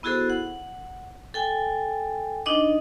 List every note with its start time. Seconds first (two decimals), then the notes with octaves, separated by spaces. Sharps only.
0.03 B3 E4 F#4 G#4 A4 C5
0.30 F#5
1.34 A4 G5 G#5
2.46 D4 D#4 D#5 D6